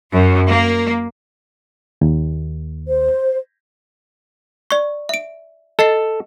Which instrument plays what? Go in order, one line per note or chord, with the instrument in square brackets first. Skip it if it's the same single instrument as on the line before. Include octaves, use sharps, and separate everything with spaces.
[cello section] F#2
A#3
[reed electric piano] D#2
[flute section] C5
[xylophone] D5 C#6
E5 D7
[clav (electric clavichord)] A4 [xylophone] D#5 A6 C7